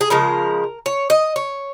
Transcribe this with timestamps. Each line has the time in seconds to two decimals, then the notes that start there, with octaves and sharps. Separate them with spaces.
0.01 G#4
0.10 C#3 F3 G#3 A#4
0.86 C#5
1.10 D#5
1.36 C#5